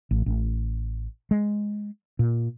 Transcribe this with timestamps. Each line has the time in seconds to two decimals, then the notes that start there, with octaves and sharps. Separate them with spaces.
0.11 A1
0.26 A1
1.31 G#3
2.19 A#2